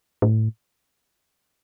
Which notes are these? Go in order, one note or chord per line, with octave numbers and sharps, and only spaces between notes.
A2